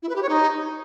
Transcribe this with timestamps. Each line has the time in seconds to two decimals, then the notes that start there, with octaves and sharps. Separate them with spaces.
0.02 E4
0.09 B4
0.15 G4
0.22 C#5
0.29 D#4